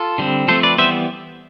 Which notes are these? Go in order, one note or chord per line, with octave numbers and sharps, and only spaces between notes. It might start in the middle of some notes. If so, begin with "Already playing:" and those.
Already playing: F4 A4
D3 G3 C4
F3 A3 C4 A4 C5
B4 D5
E3 G3 B3 C5 E5